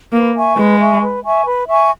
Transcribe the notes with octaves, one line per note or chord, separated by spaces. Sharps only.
A#3 B4
E5 G#5 C#6
G#3 B4
E5 G#5 C#6
B4
E5 G#5 C#6
B4
E5 G#5 C#6